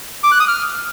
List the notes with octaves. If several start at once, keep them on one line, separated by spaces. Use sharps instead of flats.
D6
F#6
D#6
F6